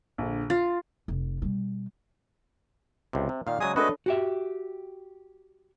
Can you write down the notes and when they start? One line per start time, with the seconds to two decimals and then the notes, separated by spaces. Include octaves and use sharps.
0.18 A#1 D3
0.50 F4 A6
1.08 F1
1.42 B2 G3
3.13 C#2 C3
3.29 C3
3.47 A#2 D#3 D5 F5
3.61 C#3 F#3 G#3 G#5 D#6
3.76 G#3 A3 D4 F#4 A4 B4 C#5 D#5
4.06 F#4 G4 E5